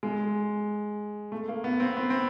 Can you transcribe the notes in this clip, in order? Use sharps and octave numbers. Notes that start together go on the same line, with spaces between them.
G#3
A3
A#3
B3
C4
B3
C4